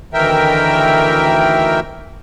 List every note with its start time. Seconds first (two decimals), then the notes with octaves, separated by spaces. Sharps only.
0.14 D2 D#3 E3 A#4 E5 G5